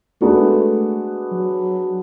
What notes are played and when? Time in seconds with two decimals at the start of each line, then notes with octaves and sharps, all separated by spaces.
0.21 G#3 A3 B3 D4 F#4
1.32 F#3